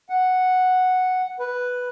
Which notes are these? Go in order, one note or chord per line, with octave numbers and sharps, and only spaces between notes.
F#5
B4